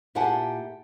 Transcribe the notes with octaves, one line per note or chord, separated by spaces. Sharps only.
A#2 E4 G4 F#5 G#5 A5